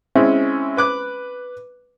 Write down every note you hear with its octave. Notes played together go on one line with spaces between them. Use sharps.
G#3 C4 C#4 E4
B4 D6 F#6